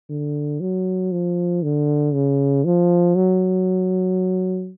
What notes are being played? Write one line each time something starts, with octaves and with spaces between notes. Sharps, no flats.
D3
F#3
F3
D3
C#3
F3
F#3